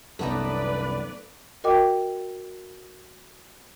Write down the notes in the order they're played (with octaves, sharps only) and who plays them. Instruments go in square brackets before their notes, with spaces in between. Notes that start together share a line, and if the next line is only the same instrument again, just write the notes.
[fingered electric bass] C2 F#2 [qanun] A3 B3 D#4 [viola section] B4 D5
[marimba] F#4 A#4 D#5 G5 D6